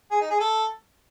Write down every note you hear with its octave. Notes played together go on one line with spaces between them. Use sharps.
G#4
D#4
G#4
A4